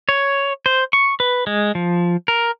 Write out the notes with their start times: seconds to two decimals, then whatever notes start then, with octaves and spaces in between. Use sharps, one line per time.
0.09 C#5
0.66 C5
0.93 C#6
1.20 B4
1.47 G#3
1.75 F3
2.28 A#4